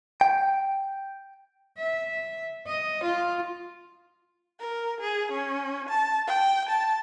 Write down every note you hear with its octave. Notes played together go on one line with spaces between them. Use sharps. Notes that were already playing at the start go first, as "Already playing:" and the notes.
G5
E5
D#5
F4
A#4
G#4
C#4
A5
G5
A5